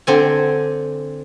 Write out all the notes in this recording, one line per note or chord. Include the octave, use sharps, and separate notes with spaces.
D3 C4 G#5